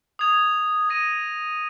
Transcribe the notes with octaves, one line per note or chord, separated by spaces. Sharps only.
D#6 G#6 F7
D#6 A#6 D#7